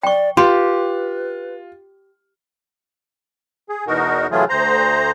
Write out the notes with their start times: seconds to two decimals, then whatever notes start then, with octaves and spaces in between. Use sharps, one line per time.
0.03 D5 G5 C#6
0.37 F4 G4 B4 C6
3.69 G#4
3.87 E2 B2 D#4 F#4 A#4
4.31 C3 E3 F#3 A3 F4 G#4
4.49 D2 C5 A#5